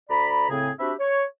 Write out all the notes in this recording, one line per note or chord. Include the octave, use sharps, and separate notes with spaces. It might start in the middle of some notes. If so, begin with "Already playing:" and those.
D2 D5 A#5 B5
A2 C#3 C4 G#4
C4 D4 F#4 G4 E5 B5
C#5